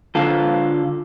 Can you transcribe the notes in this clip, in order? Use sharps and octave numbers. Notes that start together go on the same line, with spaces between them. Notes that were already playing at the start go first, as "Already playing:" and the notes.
D3 F4 A4